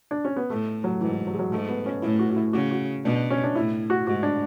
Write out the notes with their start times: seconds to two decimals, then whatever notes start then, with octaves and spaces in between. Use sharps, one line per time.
0.11 D4
0.25 C#4
0.36 B3
0.50 A2 A3
0.84 F#3
1.01 G#2 E3
1.13 E3
1.27 F#3
1.34 G#3
1.39 F#3
1.52 G#2 A3
1.69 B3
1.86 C#4
2.02 A2 E4
2.19 F#4
2.30 F#4
2.36 E4
2.53 C#3 F#4
2.71 F#4
3.04 B2 D4
3.30 C#4
3.44 D4
3.55 A2 E4
3.90 F#4
4.07 G#2 F#4
4.23 D4